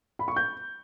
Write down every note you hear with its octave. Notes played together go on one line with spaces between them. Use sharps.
B5
C#6
G6